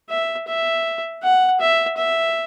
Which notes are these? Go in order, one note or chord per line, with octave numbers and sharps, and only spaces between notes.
E5
E5
F#5
E5
E5